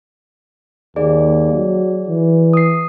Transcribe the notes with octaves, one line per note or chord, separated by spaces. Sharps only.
D#2 G#4 D5
F#3
E3
D#6 C7